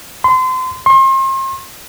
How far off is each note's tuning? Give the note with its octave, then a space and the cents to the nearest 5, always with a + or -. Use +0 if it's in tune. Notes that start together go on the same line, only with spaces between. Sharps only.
C6 -30
C6 +40